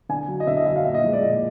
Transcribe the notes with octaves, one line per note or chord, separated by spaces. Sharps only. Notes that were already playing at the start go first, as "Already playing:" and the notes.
D3 G#5
F#3
D#5
D3 E5
D#5
F#3 E5
F5
A#2 E5
D#5
F3 G#3
D5
A#2 D#5